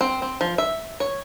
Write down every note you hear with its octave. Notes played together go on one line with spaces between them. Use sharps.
C4
C4
F3
E5
C#5